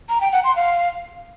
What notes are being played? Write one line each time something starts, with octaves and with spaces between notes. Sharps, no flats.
A#5
G5
F#5
C6
F5